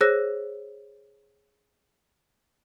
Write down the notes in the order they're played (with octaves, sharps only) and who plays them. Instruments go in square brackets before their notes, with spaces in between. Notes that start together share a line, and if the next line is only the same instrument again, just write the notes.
[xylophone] G#4 C5 C#5 E6 F#6 A#6